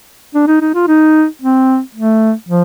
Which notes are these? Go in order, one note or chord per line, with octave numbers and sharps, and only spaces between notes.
D4
D#4
D#4
F4
D#4
C4
A3
F3